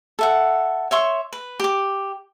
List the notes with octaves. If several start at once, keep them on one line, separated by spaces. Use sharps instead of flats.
A4 E5 F#5
C#5 E5 C6 C#6
B4
G4 D6